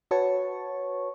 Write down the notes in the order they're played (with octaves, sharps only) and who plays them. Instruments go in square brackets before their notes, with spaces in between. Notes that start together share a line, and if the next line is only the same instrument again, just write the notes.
[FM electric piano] F#4 B4 C#5 A5 C#6